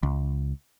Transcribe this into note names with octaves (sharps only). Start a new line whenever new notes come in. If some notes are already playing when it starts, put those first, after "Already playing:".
C#2